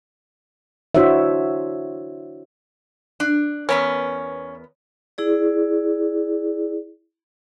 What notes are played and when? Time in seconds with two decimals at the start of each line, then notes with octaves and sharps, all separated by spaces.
0.95 D4 E4 F#4 C5 C#5 E5
3.20 D4
3.69 E2 B3 C#4 A#4
5.18 E4 G#4 D5